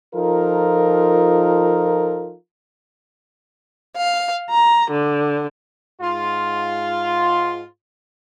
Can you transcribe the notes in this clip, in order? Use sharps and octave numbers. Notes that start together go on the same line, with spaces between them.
F3 D#4 F4 A4 A#4
F5
A#5
D3
G#2 F4